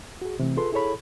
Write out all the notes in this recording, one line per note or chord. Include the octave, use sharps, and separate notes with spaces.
F#4 G#4
C3 E3 A3 C4
F4 G#4 A4 B4 C6
E4 G#4 A4 C#5 B5